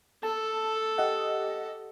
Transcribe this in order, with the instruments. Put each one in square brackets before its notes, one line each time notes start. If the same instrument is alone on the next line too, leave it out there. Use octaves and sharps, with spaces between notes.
[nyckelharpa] A4 [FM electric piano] A5
[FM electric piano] G4 D#5 F#5